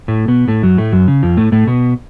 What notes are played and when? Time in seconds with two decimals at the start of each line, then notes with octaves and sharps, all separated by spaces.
0.08 A2 A3
0.28 B2 B3
0.48 A2 A3
0.63 F#2 F#3
0.78 A2 A3
0.92 F#2 F#3
1.08 C#3
1.23 F2 F3
1.37 A2 A3
1.52 A2 A3
1.67 B2 B3